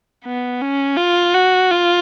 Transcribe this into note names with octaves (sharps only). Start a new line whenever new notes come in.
B3
C#4
F4
F#4
F4